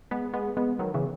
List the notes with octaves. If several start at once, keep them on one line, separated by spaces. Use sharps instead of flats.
G#3 B3
G#3 B3
G#3 B3
D#3 F#3
C#3 E3